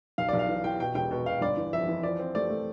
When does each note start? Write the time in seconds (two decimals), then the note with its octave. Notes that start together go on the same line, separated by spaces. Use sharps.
0.18 B1 F5
0.29 D5
0.33 B1
0.39 F5
0.49 E3
0.64 E3 G5
0.80 B2 G5
0.95 E1 G5
1.11 B2
1.26 B2 F5
1.41 G1 D5
1.57 E3
1.73 F2 E5
1.88 E3
2.03 F3 D5
2.19 C4
2.35 A3 D5
2.50 A3